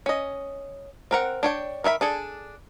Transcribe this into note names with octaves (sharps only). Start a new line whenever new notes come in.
C#4 D#5
C4 A#4 F#5
D4 C#5 G5
D#3 A#4 E5 B5
D4 G#4 A4